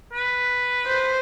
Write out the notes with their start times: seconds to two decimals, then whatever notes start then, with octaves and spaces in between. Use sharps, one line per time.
0.13 B4
0.87 C5